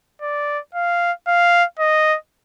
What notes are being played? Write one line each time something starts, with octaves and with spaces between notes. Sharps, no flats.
D5
F5
F5
D#5